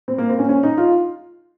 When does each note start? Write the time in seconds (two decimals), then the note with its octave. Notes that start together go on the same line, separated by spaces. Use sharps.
0.08 C4
0.18 A#3
0.29 C4
0.39 C#4
0.49 C#4
0.63 D#4
0.78 F4